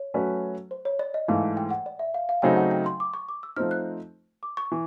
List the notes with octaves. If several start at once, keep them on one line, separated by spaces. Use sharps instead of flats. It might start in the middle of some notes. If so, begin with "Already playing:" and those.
Already playing: C#5
F#3 A3 C#4 F#4 B4
C5
C#5
D5
D#5
G#2 E3 A3 F5
G5
F#5
D5
E5
F5
F5
C#3 F#3 A3 C4 D#4 G5
F#5
G5
C6
D6
C#6
D6
E6
F3 A3 C4 D#4 F6
F#6
D6
C#6
E3